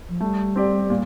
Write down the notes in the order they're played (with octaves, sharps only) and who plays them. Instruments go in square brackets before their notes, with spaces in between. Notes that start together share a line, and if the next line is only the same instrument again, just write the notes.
[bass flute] F3
[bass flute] G3 [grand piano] A3
[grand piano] C4 G4 D5
A#2